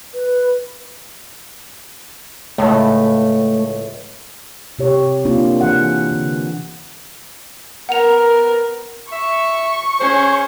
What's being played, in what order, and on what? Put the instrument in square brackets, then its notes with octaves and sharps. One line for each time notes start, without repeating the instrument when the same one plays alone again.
[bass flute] B4
[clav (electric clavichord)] C#2 A2 [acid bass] A3
[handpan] C3 G4 C#5
A#3 C4 D4 F4
E3 G#4 F#5
D3
[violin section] B3 A#4 [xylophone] F#5 F7
[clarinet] E5 [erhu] C#6
[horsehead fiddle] C#4 G#4 [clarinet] C5